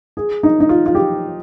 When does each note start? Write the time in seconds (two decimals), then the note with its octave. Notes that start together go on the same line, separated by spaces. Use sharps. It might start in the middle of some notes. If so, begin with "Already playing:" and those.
0.17 G#4
0.43 D#4
0.60 D#4
0.69 F4
0.86 F4
0.95 G4